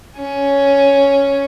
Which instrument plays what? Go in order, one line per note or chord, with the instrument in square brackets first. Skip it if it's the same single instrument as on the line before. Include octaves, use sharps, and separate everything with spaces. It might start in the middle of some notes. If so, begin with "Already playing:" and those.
[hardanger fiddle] C#4